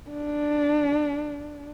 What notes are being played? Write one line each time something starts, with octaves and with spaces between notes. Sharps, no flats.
D4